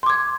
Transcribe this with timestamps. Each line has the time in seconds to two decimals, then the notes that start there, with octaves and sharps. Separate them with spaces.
0.03 C6
0.06 D6
0.10 G#6